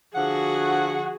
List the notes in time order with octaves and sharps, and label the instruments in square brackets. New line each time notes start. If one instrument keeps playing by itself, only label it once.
[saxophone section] D3 F3 F#5 [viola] F#4 G#4